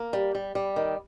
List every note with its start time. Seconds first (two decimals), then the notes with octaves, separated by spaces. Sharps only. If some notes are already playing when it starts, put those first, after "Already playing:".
Already playing: A#3
0.13 G3
0.35 G3
0.55 G3
0.76 D#3